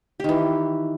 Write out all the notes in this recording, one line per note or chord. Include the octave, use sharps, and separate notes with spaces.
D#3 E3 G4